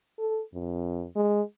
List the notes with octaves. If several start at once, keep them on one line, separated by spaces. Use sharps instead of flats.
A4
F2
G#3